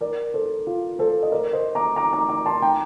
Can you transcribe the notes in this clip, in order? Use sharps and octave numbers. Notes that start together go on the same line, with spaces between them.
A#4 D5
A4 C5
F4
A4 C5
D#5
A#4 D5
C5 D#5
A#5 D6
A#5 D6
A#5 D6
A#5 D6
A5 C6
G5 A#5